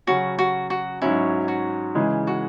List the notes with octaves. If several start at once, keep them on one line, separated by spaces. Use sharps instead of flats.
C#3 F#3 C#4 F#4
F#4
F#4
G#2 F#3 C#4 E4
F#4
C#3 E3 G#3
F#4